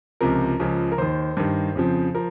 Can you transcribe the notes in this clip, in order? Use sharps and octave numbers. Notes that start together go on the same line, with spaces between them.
C#2 C3 F3 A#4
C#2 C#3 F3
A#4
D#2 D#3 C5
G2 D#3
F2 C#3 F3
F3 A#4